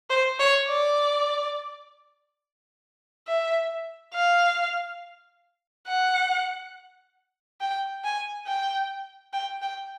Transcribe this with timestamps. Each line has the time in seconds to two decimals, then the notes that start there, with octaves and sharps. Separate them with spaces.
0.10 C5
0.39 C#5
0.68 D5
3.27 E5
4.14 F5
5.87 F#5
7.61 G5
8.04 G#5
8.47 G5
9.33 G5
9.62 G5